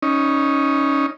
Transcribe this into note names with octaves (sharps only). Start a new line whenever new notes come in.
C#4 D#4